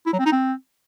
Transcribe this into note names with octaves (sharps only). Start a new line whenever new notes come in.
E4
F#3
C4
D#4
C4